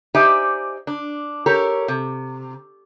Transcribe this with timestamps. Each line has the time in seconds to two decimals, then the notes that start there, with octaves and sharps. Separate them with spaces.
0.14 D#4 G4 C5 D5 E5 G#5
0.87 D4
1.46 G4 A4 A#4 C#5
1.88 C3